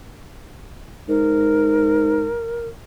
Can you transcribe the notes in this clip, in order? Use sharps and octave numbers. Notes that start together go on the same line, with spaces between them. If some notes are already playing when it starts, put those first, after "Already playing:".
G#2 A#4